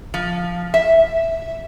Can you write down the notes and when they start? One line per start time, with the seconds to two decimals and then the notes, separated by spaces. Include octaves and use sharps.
0.14 F3
0.74 E5